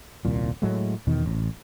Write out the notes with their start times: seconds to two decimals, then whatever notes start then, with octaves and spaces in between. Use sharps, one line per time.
0.25 D#1 C2 A#2
0.62 A2 F#3 G#3 A3
1.07 E2 B2 D#3
1.26 A1